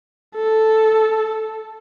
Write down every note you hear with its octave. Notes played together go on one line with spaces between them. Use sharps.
A4